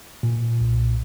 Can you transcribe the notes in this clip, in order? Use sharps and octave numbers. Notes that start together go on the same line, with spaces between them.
A#2
B1